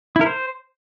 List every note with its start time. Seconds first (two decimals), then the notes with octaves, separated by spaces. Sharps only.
0.16 E4
0.21 A#4
0.26 C5